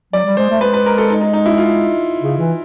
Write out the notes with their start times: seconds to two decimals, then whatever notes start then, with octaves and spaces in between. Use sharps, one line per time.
0.13 F#3 D5
0.25 G3
0.37 G#3 C5
0.50 A3
0.61 G#3 B4
0.74 B4
0.86 A#4
0.98 A4
1.10 D#4
1.21 D#4
1.33 D#4
1.46 E4
1.58 F4
2.22 C#3
2.38 E3